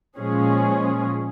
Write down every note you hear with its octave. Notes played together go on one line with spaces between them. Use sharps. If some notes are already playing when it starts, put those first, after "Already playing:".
A#2 F3 G#3 C#4 G#4